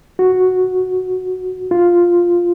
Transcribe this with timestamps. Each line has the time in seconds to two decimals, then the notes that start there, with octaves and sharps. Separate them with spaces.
0.19 F#4
1.71 F4